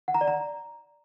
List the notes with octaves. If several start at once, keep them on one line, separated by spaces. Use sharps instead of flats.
F#5
A#5
D5
A#5